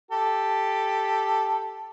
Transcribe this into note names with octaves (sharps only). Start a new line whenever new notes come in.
G4 A4